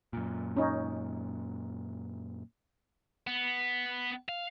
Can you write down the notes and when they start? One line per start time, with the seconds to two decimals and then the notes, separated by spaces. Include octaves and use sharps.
0.13 F#2 A#2
0.57 C#4 D#4
3.27 B3
4.29 F5